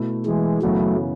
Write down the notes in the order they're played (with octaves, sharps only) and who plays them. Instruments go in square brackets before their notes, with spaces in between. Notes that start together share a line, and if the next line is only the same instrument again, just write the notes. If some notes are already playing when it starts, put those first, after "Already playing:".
Already playing: [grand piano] B2 A3 E4
[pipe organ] E3 G#3
[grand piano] F#2 C#3 E3 B3 [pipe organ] F#3 A3